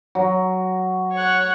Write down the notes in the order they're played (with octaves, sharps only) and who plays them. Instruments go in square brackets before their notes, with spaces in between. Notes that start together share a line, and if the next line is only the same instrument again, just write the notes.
[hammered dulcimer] F#3
[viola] C#5 F#5